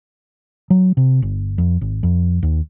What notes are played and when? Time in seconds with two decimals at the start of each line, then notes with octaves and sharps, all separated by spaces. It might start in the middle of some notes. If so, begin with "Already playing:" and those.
0.70 F#3
0.97 C3
1.22 G1
1.58 F2
1.81 G#1
2.03 F2
2.43 D#2